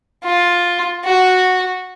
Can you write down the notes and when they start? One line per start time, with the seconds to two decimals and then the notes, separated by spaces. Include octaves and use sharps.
0.24 F4
1.05 F#4